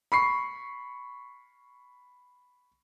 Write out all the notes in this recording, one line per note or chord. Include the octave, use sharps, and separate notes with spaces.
B5 C#6 C7